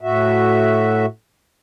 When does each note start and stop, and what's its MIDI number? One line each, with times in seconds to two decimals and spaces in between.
0.01 1.06 45
0.01 1.06 66
0.01 1.06 76